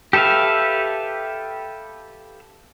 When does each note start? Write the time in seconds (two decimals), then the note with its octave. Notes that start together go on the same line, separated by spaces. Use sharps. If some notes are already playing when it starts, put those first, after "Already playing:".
0.13 G4 A4 B4 E5 F5